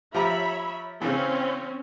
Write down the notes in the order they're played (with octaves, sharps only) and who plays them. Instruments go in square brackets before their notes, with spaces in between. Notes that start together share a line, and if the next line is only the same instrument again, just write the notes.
[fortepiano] F3 G4 A#5 [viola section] C#5 E5 B5
[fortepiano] C#3 E3 [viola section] C4 C#4